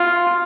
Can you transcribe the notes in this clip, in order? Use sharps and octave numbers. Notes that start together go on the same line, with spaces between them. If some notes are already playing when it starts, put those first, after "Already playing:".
Already playing: F4